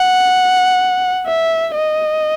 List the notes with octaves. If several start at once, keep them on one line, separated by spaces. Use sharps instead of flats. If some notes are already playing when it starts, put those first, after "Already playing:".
Already playing: F#5
E5
D#5